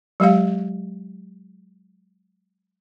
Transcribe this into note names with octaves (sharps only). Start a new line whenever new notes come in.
F#3 G#3 G4 F5